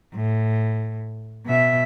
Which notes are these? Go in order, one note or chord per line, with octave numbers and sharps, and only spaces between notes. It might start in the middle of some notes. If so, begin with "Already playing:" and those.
A2
B2 E5